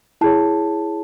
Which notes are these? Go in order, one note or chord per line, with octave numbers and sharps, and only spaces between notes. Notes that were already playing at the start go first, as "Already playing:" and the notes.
E4 G#4 C#5 A5